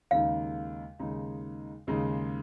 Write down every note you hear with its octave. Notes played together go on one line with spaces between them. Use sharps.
D#2 C#3 G#3 D#4 F5
D#2 C#3 G#3 D#4
D#2 C#3 G#3 D#4